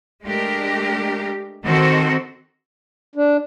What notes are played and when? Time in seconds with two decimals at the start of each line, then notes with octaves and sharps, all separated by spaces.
0.24 G#3 A3 D4 G4 A#4
1.64 D#3 C4 F#4 A4
3.16 D4